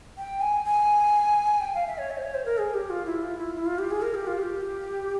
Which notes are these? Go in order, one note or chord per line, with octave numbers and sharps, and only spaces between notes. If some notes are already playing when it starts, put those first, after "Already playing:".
G5
G#5
G#5
G5
F5
E5
C#5
E5
C5
C#5
C5
A#4
G#4
G4
F4
E4
F4
E4
E4
F4
G4
G#4
A#4
G4
F4
G4